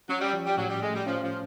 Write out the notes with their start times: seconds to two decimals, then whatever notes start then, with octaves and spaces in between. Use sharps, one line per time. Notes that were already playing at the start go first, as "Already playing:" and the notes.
0.09 F#3 C#4
0.21 G3
0.33 F3
0.46 G3
0.57 A2 F#3
0.70 G3
0.82 G#3 A3
0.95 G3
1.06 F3 C#4
1.24 F3